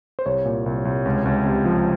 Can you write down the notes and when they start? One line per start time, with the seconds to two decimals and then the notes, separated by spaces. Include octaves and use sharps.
0.19 C5
0.26 C2 C#5
0.45 A#2
0.66 C2
0.85 C2
1.05 C#2
1.25 C#2
1.45 C3
1.65 F3